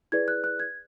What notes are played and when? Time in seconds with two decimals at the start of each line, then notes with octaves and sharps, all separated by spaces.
0.12 E4 G#4 B4 D5 G#6
0.28 F#6
0.44 F#6
0.60 G#6